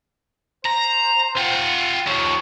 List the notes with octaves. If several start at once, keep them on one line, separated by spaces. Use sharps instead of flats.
C5 A#5
F4 F#5 G5
D#2 F3 C#5